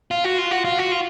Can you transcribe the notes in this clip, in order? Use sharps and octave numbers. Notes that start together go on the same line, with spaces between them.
F4
F#4
F4
F#4
F4
F#4
F4